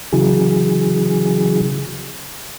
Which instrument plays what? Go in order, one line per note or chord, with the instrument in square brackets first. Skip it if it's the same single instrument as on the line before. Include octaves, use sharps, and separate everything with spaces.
[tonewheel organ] C#3 E3 F#3 G#4